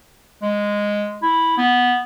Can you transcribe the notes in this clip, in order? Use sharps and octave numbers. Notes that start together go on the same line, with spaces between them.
G#3
E4
B3